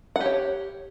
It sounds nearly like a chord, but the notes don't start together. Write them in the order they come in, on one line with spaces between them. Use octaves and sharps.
F#5 G4 C#5